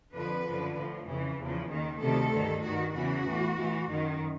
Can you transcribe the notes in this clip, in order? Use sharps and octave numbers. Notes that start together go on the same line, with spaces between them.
F2 D3 F3 B4
F#2 D3 F3
A2 F3
F2 C#3 E3
E2 C#3 F3
D#2 D#3
D2 C3 D#3 A4
G2 D#3
G2 D#3 F#4
E2 C#3 E3 F#4
A2 E3
A2 E3
F#2 D#3